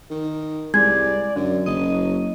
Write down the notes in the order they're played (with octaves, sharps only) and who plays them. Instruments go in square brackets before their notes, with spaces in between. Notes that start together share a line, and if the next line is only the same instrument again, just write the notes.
[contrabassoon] D#3
[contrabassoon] C2 [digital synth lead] G#3 [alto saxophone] D5 [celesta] G#6
[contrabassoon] F#2 [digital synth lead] D3 [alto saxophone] F#3
[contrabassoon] F#1 [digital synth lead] D#5